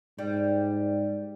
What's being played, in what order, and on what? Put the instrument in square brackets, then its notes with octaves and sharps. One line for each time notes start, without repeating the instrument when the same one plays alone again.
[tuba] G#2 [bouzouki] G3